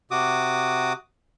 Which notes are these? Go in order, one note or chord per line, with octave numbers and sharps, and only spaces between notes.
C3 F#4 D6 D#6